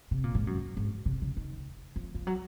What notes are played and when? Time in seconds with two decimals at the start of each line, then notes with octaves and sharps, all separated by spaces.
0.11 C3
0.24 A#2
0.35 G#2
0.47 F#2
0.77 G#2
1.06 C3
1.22 C#3
1.37 D#3
1.96 F3
2.14 F3
2.27 F#3